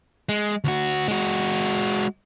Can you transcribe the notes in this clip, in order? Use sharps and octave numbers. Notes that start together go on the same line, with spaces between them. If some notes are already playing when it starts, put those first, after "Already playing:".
G#3
D2 F#4
G#3 F#4